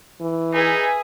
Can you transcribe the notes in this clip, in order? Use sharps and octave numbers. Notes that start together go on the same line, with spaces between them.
E3
D#4 G#4 B4 E5